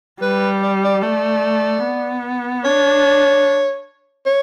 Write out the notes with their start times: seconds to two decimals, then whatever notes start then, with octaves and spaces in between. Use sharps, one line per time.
0.22 G3 B4
0.62 D5
0.84 D5
1.02 A3 D5
1.83 B3
2.64 D4 C#5
4.26 C#5